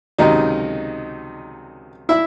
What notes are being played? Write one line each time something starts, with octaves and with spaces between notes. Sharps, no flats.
C#2 C3 D#3 F#3 D#4 D#5
E4 E5